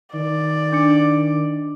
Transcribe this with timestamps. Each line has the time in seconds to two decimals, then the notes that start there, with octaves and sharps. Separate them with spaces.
0.13 D#3 D5
0.72 D4 D6 C#7